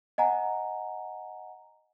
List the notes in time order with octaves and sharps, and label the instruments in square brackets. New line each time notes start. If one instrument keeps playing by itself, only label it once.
[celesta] D#5 F#5 G#5 A#5